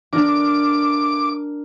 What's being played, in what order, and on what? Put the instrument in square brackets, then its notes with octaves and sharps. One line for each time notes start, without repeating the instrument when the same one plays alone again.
[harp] D4 A#4 [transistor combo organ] D6